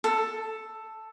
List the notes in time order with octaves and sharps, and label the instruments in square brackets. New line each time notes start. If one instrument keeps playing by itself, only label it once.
[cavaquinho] A4